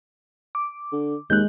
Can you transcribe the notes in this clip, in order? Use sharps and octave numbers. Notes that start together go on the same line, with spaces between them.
D6
D3
D#2 G#3 F#6 G6